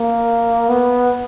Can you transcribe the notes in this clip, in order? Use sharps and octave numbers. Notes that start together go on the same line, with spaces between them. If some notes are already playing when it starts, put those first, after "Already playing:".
Already playing: A#3
B3